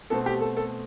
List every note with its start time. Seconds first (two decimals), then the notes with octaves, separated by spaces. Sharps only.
0.10 B2 A3 C4 A4
0.26 G4
0.41 A4
0.57 A4